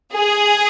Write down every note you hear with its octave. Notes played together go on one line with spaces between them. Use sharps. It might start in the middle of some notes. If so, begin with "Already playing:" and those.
G#4